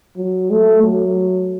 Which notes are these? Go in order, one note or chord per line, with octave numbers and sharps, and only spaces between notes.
F#3
A3
F#3